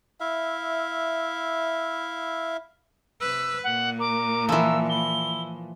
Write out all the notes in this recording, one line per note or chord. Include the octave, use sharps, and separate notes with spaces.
E4 E5 F5
C3 B4 E6
A#2 F#5
A#4 D6
E3 F3 E6
E4 G7